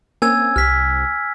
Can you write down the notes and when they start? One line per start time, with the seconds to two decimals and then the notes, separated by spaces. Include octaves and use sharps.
0.22 A#3 C4 C#4 G#5 E6 G#6
0.56 C2 F6 B6